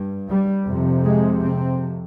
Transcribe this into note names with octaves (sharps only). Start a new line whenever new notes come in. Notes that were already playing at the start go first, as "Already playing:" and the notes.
Already playing: G2
G3
F2 C3
G#3
C4